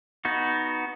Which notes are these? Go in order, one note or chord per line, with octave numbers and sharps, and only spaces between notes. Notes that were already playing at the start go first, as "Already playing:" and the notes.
B3 D#4 F#4